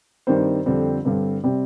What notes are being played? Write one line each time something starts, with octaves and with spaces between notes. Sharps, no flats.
G2 D#3 G3 C4 C5
F2 D3 G3 C4
G2 D3 G3 C4
C3 G3 C4